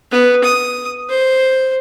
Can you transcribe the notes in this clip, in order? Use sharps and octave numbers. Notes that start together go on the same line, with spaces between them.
B3
D#6
C5